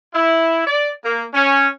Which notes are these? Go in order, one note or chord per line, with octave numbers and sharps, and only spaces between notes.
E4
D5
A#3
C#4